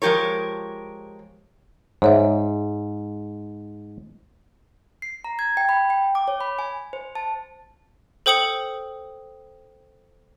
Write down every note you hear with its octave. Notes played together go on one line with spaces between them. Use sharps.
F3 G#3 G4 A#4 C#5
G#2 C5 C#5 E5
C7
A#5
G#6
G5
B5
G5
D6
C#5
B5
G#5
C5
A5
A4 C5 G5 D#6 C#7 F#7